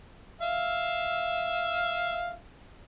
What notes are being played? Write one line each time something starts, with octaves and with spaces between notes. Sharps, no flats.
E5 F5